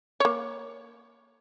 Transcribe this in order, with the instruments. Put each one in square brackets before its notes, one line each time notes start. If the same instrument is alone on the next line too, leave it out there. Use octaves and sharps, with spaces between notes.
[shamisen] A#3 C#5